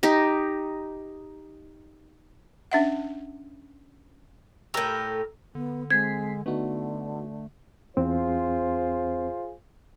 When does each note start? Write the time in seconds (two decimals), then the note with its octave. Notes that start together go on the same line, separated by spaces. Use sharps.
0.03 D#4 G4
2.72 C#4 D4 E5 F#5
4.74 A2 G4 A#4 A#5 E6
5.55 D3 B3
5.91 G#3 C4 G#6 B6 C7
6.46 D3 A3 B3 D#4 F#4
7.97 E2 C4 F4 G#4 C5